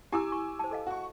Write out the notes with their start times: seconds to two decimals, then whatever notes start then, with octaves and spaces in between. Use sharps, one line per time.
0.12 E4 G4 G#5 D6 E6
0.32 C#6
0.59 C5 A5
0.71 A4 D#5 F5
0.87 F#4 C#6